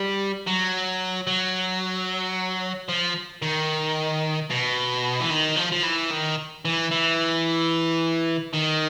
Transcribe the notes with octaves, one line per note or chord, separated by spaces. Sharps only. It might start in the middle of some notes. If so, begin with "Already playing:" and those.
Already playing: G3
F#3
F#3
F3
D#3
B2
E3
D#3
F3
F3
E3
D#3
E3
E3
D#3